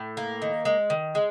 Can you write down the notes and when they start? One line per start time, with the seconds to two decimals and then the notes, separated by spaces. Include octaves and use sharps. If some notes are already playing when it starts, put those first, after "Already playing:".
Already playing: A2
0.17 A#3
0.42 D#3
0.65 G#3
0.90 D#3
1.15 G#3